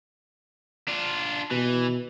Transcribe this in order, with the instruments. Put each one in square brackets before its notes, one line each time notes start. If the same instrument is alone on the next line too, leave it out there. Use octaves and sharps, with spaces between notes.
[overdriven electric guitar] D4 F4
[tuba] B2 [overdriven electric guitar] E3